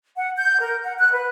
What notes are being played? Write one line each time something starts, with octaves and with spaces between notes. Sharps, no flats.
F#5
G6
A#4
F#5
F#6
B4